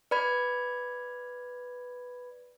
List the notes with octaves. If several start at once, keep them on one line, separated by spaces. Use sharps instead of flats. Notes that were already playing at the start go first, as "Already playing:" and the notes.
B4 D5 B5 G#6